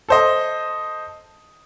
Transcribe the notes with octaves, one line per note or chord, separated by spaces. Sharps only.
A4 C5 D#5